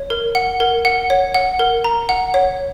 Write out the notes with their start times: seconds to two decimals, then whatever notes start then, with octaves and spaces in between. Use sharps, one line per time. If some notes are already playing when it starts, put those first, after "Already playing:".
Already playing: C#5
0.10 A#4
0.35 F#5
0.60 A#4
0.85 F#5
1.10 C#5
1.34 F#5
1.59 A#4
1.84 A#5
2.09 F#5
2.34 C#5